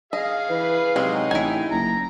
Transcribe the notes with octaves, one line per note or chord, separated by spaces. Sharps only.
G#4 D#5 F5
E3 B4
A2 C3 F#3 G#3 D#4 G5
A1 E4 G#5
F#1 A#5